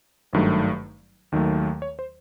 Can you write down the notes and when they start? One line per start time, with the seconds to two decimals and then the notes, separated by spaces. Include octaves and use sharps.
0.33 G#1 G2 D#3 F#3 A3
1.32 D#2 D#3 F#3 A3
1.82 C#5
1.99 C5